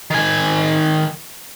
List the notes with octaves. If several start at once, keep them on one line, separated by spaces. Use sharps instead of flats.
D#3 G#5